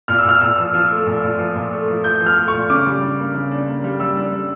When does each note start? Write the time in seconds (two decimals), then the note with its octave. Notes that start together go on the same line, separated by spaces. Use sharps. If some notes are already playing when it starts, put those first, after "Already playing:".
0.08 A#2 F6
0.18 E6
0.25 A#2 F6
0.41 A#2 E6
0.58 F3
0.73 F3
0.91 A3
1.06 A#2
1.23 A#2
1.39 F3
1.55 A#2
1.72 A3
1.88 F3
2.04 F3 G6
2.21 F3
2.26 F6
2.37 A3
2.48 C#6
2.53 A#2
2.70 C#3 D6
2.86 G3
3.02 D4
3.19 A#3
3.35 C#3
3.51 D4
3.67 A#3
3.84 G3
4.00 G3 E6
4.17 D4
4.33 G3